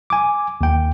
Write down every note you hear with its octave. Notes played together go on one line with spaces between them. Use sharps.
G#5 D6
D#2 G5